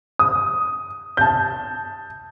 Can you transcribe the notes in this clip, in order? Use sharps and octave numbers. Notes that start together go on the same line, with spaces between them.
D#6
A5 G6